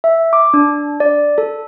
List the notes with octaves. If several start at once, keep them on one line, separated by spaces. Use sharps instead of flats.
E5
D6
D4
D5
A4